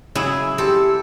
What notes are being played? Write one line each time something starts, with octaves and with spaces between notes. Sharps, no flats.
C#3 F#3 E4 G#4
C4 G4 A4